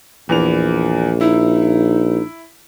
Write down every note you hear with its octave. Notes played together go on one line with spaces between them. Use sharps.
A#1 E2 E3 F7
D#4 E4